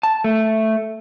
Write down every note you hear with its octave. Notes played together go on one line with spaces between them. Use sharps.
A5
A3